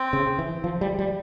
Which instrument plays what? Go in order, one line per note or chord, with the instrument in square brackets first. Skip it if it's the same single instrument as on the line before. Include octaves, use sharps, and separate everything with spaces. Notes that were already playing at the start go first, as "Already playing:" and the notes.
Already playing: [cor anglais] C4
[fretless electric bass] C#3
E3
F3
G3
G3